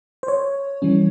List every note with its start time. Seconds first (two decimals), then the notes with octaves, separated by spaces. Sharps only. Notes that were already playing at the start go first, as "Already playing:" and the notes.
0.23 C5
0.28 C#5
0.82 E3 G3 C#4